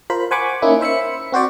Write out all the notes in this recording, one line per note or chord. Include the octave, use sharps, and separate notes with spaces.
F4 A#4 C5 B5
C5 F#5 G#5 B5 C#6 D6
A#3 C#4 D#4 E4
C5 E5 B5 C#7
C4 F#4 C5 D5